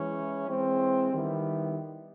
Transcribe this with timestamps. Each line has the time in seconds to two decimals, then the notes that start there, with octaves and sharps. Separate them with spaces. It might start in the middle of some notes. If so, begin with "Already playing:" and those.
Already playing: E3 G#3 C#4 E4
0.48 E3 G#3 C4
1.13 D#3 G3 B3 E4